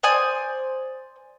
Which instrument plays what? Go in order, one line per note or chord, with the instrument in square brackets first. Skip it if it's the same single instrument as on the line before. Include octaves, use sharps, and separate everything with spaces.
[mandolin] C5 D5 G#5 D#6